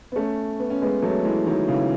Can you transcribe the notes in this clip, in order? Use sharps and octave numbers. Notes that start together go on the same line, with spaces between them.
B3
A3 C#4
B3
C#4
G#3 B3
F#3 A3
E3 G#3
D#3 F#3
C#3 E3